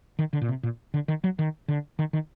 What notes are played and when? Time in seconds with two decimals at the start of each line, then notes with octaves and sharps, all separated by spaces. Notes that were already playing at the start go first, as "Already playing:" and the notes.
0.19 D#3
0.33 D3
0.42 A#2
0.49 C3
0.63 A#2
0.94 D3
1.08 D#3
1.24 F#3
1.39 D#3
1.68 D3
1.99 D#3
2.13 D#3